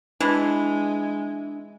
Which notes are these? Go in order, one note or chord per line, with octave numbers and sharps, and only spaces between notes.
E3 G#3 D4